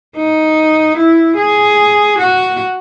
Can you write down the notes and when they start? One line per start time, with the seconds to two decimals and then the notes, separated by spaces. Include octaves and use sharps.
0.16 D#4
0.97 E4
1.37 G#4
2.18 F#4